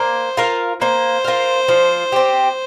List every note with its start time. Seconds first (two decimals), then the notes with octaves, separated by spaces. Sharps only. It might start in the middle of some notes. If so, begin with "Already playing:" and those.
Already playing: A#3 C5
0.37 F4 A#4 F5
0.81 A#3 C5
1.24 F4 A#4 F5
1.68 F3
2.12 C4 G4